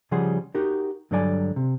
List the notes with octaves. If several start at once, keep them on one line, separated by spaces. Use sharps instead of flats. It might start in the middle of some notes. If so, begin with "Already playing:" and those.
C#3 F3 G3 G#4 F#5 C6
D#4 F#4 G4 A#4
G2 D3 F#3 A4 D5 G#5
C3